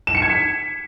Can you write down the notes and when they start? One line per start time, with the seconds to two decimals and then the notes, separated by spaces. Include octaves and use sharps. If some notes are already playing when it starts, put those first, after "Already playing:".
0.07 E7
0.15 C#7
0.22 G#6
0.30 B6